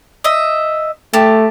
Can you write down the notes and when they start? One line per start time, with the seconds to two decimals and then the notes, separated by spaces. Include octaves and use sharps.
0.24 D#5 E5
1.14 A3 G4 A5